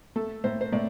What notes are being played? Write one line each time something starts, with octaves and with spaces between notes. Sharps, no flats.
A3 A4
A2 C5
C5
A2 D5